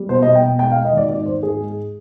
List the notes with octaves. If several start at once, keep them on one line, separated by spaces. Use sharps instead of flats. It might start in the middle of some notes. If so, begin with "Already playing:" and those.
Already playing: G3
B2 C5
D#5
B2
G5
B2
G#3 G5
F5
G#3
D#5
G#1 D5
G#2 D5
G#1 C5
G#2 G#4
G#3